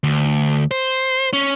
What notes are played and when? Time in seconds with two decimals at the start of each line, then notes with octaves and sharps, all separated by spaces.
0.03 D2
0.71 C5
1.33 C#4